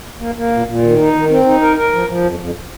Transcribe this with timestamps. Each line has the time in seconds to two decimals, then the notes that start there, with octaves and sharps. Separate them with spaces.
0.19 A#3
0.35 A#3
0.51 A#2
0.66 A#2
0.82 D#3
0.98 D#4
1.14 D#3
1.29 C4
1.45 D#4
1.61 A#4
1.76 A#4
1.92 F3
2.07 F3
2.23 F2
2.39 F2